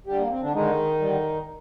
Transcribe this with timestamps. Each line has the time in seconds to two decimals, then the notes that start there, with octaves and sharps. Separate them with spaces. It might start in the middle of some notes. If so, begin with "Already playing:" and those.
0.07 D3 G3 G4
0.18 A#3
0.30 C4
0.42 D3 D4
0.54 D3 D#3 G#3 D#4
1.00 D3 G3